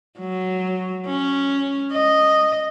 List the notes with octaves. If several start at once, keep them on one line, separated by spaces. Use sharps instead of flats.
F#3
C#4
D#5